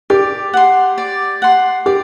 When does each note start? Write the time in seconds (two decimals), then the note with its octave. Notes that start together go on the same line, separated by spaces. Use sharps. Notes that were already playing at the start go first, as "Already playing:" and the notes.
0.10 G4 D5
0.53 F#5 C6
0.98 D5
1.42 F#5 C6
1.86 G4 D5